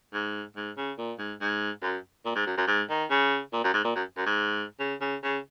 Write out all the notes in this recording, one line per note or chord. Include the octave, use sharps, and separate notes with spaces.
G#2
G#2
C#3
A#2
G#2
G#2
F#2
A#2
G#2
F#2
F#2
G#2
D#3
C#3
A#2
F#2
G#2
A#2
F#2
F#2
G#2
C#3
C#3
C#3